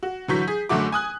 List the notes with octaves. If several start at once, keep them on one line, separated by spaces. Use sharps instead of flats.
F#4
D3 E3 F#3 C#6 G6 B6
G#4
F#1 D3 F#3 A3 F#4 D6
G#5 D#6 F#6